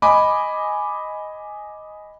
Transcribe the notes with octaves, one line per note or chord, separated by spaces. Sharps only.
D#5 G#5 B5 D6